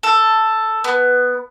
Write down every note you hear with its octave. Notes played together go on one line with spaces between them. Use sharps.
A4
B3